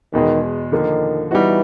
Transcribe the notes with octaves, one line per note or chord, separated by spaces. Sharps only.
E2 B2 D#3 G#3
D3 D#3 F3 A#3 D#4
E3 G3 B3 D#4 F#4